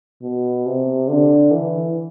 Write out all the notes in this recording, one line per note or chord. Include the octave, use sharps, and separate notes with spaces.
B2
C3
D3
E3